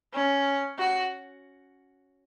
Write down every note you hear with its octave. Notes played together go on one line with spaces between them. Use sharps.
C#4
F#4